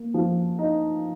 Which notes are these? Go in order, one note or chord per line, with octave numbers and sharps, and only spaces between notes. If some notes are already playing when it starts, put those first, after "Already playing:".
Already playing: A#3
F3
D#4